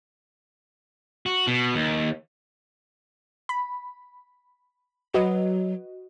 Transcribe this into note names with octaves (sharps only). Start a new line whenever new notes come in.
F#4
B2
D#2
B5
F#3 F#4 B4 D#5